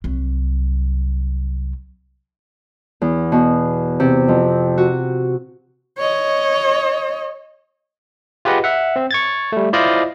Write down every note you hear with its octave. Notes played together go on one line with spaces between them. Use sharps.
C2 F#3
E2
B2
C3
F2
F#4
C#5 D#5
F4 G4 G#4 B4 D#5 F#5
E5 F#5
C4
C#6 G#6 A6
G3 A3
E4 F4 C5 D5 D#5 F5